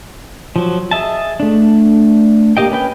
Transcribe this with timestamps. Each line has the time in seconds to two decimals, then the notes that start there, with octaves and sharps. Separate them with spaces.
0.56 F3 F#3
0.91 G#4 D#5 E5 A5
1.40 A3 D4
2.57 A#3 G4 D#5 G5
2.72 C#4 B4 G5